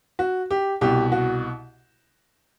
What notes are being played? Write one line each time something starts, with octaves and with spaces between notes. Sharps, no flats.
F#4
G4
C2 B2 G4
F#4